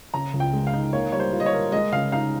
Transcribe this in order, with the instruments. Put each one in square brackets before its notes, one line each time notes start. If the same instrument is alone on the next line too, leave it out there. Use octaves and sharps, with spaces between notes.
[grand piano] C#3 [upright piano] A#5
[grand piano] C#2
[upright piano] G5
[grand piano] G#3
[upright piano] F5
[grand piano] D#4
[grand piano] A#3 [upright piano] C#5
[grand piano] G3 [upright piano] C#5
[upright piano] C5
[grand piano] F4
[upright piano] D#5
C#5
[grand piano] A#4
[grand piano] G#3 [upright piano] D#5
[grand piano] C#3 [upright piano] F5
[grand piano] D#4 [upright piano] F5